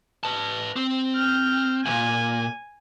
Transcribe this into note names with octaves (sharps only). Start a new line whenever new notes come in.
B4 A5
C4
F6 G6
D2 A#2 G#5